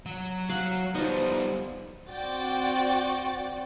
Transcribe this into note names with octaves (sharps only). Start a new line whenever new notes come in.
F#3
F#3 F5 F#5
F3 G3 B3 D#4
C4 F#4 D5 G5 A6